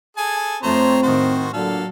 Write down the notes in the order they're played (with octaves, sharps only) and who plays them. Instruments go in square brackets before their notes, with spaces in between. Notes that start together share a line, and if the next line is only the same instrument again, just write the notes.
[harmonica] G#4 A4 G#5
[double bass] F2 A3 [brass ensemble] C4 [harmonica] C5 C#5 A#5
[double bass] A2 D#3 [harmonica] F#4 C5
[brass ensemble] A#2 D3 [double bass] F#3 [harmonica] A4 F5